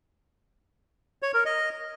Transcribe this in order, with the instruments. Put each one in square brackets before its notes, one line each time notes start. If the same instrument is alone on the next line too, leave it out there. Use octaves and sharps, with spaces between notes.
[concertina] C#5
A#4
D#5